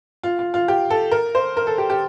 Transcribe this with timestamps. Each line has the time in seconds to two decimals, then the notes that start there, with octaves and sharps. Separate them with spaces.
0.23 F4
0.39 F4
0.54 F4
0.68 G4
0.90 A4
1.11 A#4
1.35 C5
1.57 A#4
1.67 A4
1.78 G4
1.90 G4